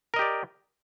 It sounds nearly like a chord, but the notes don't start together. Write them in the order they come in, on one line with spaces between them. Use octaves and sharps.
A#4 D#5 G4 D5